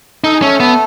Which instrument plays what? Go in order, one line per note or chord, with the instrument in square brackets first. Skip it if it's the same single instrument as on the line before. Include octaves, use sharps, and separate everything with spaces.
[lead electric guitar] D#4 [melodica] A4
[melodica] G#4
[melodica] A3 A4 [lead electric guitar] C#4
[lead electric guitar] B3